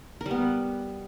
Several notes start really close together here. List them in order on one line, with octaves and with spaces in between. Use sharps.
A#4 G3 B3